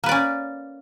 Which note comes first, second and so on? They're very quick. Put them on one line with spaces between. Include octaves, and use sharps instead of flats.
A#3 B4 D5 C#4